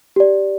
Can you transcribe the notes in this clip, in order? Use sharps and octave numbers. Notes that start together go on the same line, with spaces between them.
G4 D5